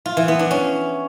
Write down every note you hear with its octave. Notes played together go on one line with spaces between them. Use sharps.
F4
E3
B3
D4
C#4